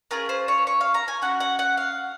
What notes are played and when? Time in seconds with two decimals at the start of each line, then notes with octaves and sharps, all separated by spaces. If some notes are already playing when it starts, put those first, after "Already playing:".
0.11 C#4 F4 G#4 A#4
0.29 C5
0.48 C#5
0.67 C#5
0.81 F5
0.94 A#5
1.08 G#5
1.22 C#4 F#4 F#5
1.40 F#5
1.59 F#5
1.77 F5